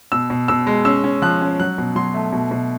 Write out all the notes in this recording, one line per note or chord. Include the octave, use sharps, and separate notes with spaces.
B2 E6
B2
B2 E6
G#3
C#4 E6
C#4
F3 F#6
C#4
F#3 F#6
B2
F#3 C6
A3
B2
B2